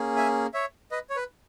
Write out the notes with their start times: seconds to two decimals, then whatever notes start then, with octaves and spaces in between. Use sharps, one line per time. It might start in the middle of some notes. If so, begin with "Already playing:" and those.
Already playing: A#3 C#4 G#4
0.16 E5 G#5
0.54 C#5 E5
0.91 B4 D#5
1.10 C#5
1.16 B4